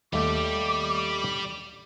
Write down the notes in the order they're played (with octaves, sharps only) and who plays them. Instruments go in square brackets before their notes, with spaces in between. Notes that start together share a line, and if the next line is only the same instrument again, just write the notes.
[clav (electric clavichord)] D#2 A3 [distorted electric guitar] G3 G4 [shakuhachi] D6